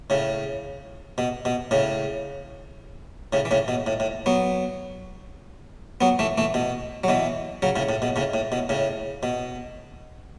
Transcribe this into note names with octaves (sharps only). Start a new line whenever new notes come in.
A2 C#3
B2
B2
A2 C#3
A2 C#3
E3
A2 C#3
B2
A2
A2
F#3 B3
F#3 B3
E3 A3
E3 A3
B2
F#3
B2 E3
C#3 F#3
A2 C#3
A2
B2
A2 C#3
A2
B2
A2 C#3
B2